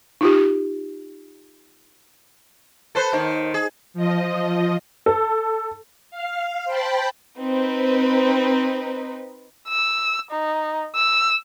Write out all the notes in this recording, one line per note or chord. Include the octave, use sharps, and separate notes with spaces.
D#4 F4 G4
A4 B4 C5
D#2 D#3 C5
G#4
F3 D#5
A4
F5
C5 G5 A5 B5
C4 D#4 B4
E6
D#4
E6